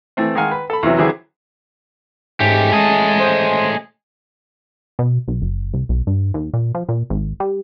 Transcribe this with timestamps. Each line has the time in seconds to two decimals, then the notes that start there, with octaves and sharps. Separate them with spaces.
0.17 E3 A3 C4
0.35 D#3 G#3 F5 F#5 G#5 F6
0.51 B4
0.70 A4 B5
0.83 E2 C3 E3 F#3
0.98 D3 E3 F#3 C4 E4 G#4
2.40 G#2 G#3 A3 C#4 G4
2.73 G#4 D#5 A5
3.19 C5
4.99 B2
5.28 B1
5.42 F#1
5.74 C2
5.89 B1
6.07 G2
6.34 D#2
6.54 A#2
6.75 F3
6.89 A#2
7.10 G#1
7.40 G3